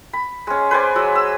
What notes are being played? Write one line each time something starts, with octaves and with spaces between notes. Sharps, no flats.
B5
G#3 C#4
B4 C5 D5 G#5
F#3 G#3 E6
E6